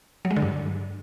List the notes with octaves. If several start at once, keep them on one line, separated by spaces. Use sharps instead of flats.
F#3
G#3
D3
G2